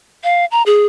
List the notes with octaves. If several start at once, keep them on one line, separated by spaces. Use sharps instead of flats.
F5
A#5
G#4